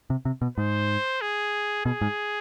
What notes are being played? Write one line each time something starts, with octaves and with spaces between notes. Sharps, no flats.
C3
C3
B2
G#2 C5
G#4
B2 G#4
G#2